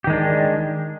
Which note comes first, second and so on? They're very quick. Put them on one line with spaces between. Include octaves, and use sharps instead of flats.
G4 D#3 G#3 D4